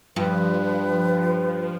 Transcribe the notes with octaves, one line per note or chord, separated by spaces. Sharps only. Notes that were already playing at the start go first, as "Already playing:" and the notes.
G2 F3 B4